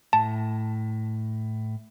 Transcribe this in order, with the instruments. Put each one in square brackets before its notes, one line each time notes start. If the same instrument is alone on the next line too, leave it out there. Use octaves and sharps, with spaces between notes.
[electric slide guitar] A2 [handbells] A5